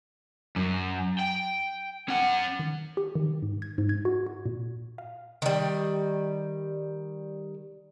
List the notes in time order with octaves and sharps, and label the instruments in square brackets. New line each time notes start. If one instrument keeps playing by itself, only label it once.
[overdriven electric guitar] F#2
G5
C#4 F#5
[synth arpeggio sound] D#3
G4
D#3
G#2
G#6
G#2
G#6
F#4
F#4
A#2
F5
[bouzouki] D#3 G3